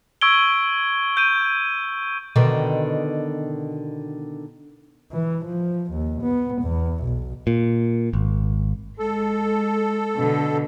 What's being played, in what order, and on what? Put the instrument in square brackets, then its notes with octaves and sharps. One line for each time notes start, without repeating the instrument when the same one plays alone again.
[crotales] C#6 E6 G#6 D7 G7
G6 D7 D#7
[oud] B2 D3 D#3
[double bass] E3
F3
D#2
B3
E2
B1
[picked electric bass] A#2
G#1
[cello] G#3 [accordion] A4
[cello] B2 D3